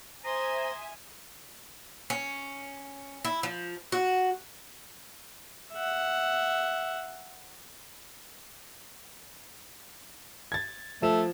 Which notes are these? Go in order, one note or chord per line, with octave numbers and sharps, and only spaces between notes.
C5 E5 G#5 A#5 C6 D#6
C#4
E4
F3
F#4
E5 F#5
G#6 A6
F3 A3 E7